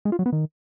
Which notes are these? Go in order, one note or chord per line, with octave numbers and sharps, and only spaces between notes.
G#3
F4
F#3
B3
D#3